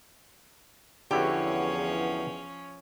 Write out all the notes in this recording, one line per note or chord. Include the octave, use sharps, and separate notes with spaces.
E2 D3 F3 C#4 E4 F#4 G4 C#5